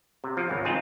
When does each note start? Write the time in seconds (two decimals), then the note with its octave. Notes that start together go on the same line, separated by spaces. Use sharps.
0.24 C3
0.37 F3
0.49 G#1 C#2 C#5
0.65 C4 D#4 F4 G#4